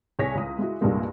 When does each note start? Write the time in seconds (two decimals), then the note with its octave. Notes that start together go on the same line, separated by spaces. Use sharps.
0.19 C2 G#4 C#5 G#5 A#6 B6
0.35 C#2 D#6
0.59 G#3 E4 F#4
0.81 C2 G2 A#2 G3 G#3 A#3